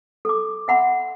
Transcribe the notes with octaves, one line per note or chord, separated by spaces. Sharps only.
A4 D6
E5 F#5 B5 C6